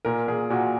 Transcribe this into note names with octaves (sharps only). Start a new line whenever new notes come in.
A#2 A#4
A#2 G#4
A#2 F#4